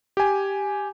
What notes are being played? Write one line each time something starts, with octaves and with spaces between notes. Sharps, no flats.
G4 G#5